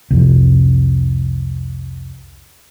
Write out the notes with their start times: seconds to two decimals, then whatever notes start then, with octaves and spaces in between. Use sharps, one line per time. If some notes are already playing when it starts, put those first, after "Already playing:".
0.10 C2 F2